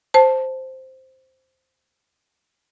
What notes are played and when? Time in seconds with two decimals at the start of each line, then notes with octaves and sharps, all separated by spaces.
0.14 C5 A5